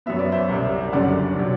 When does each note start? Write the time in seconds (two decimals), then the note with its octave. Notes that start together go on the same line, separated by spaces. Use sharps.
0.06 F#2 F#3 B3 E5
0.19 D5
0.32 C5 E5
0.49 C2 C3 G3
0.92 F#1 F#2 D3 G3 D5 F#5
1.36 C3 F#3